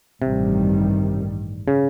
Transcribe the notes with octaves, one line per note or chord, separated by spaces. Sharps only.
A1 G2 C3 D#3 G3
C#3